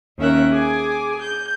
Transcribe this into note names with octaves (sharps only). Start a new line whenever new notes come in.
D#2 C#4 A#4 E5 F#6
G#4 G#5 D6
G6